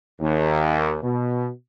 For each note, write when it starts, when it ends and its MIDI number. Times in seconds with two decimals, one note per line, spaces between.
0.20 0.96 39
1.03 1.48 47